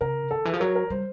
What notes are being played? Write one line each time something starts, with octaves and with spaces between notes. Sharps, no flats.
C#3 A#4
D#3 A4
E3 G#4
F3
F#3 A#4
A#4
G3 C5